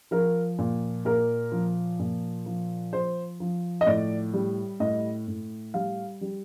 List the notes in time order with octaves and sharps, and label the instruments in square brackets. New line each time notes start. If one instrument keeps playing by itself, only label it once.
[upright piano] F3 A#4
A#2
A#2 A#4
F3
A#2
F3
F3 C5
F3
D#5
A2 D5
G3
A2 D#5
A2
G3 F5
G3